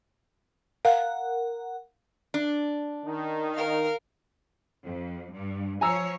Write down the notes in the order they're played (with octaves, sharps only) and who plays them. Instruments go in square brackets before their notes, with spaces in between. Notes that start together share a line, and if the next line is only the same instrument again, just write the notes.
[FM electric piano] A#4 F#5 [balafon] F5
[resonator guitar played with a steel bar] D4
[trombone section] D#3 D#4
[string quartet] A#4 F5
[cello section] F2
G2
[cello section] F3 C#5 [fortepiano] G#5 A#5 E6